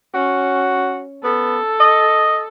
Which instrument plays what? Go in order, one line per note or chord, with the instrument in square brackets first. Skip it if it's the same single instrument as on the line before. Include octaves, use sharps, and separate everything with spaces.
[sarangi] C#4 [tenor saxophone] F#4
[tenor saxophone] B3 [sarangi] A4
[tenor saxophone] D#5